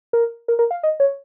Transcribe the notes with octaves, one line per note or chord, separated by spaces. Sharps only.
A#4
A#4
A#4
F5
D#5
C#5